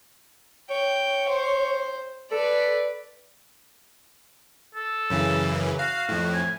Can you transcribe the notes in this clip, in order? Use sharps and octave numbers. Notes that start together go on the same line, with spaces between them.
C#5 G5
C5
A4 B4 D5
A4
F#2 C#3 E3
F#4 F5
F2 A2
G#5